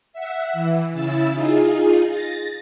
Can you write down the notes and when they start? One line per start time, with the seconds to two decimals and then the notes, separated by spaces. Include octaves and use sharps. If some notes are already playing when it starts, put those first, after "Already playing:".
0.13 E5 F#5
0.53 E3
0.92 C#3 E4 E6 A6
1.31 D#4 F4 G#4
2.09 A6 A#6